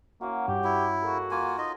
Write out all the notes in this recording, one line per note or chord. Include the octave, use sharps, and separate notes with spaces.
A#3 C#4 E4 F#4
G2 G4
E4 C#5 G#5
A#3 F#4 G#4 A4
A#3 F4 G#5 B5
D#4 F4 D#5